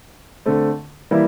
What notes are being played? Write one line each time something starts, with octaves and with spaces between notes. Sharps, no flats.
D3 A3 C4
E3 G3 A#3 E4